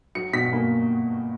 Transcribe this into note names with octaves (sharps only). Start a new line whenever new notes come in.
F#3 C#7
B2 B6
A#3